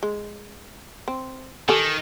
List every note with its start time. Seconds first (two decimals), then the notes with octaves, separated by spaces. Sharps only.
0.03 G#3
1.08 C4
1.69 D#3 G4 A4 G#5